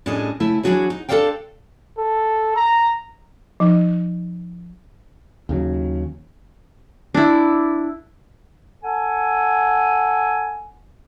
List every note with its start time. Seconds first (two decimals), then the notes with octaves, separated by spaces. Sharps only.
0.06 A2 G3 C#4 D4 G#4 D#5
0.40 C#3 A3 E4
0.63 E3 F#3 D4 F#4 G#4 C#5
0.90 D#4
1.09 D4 A4 C5 D5 F5 G5
1.98 A4
2.56 A#5
3.60 F3 D#4
5.49 D#2 C#3 F#3
7.14 D4 E4
8.84 A4 F#5 G#5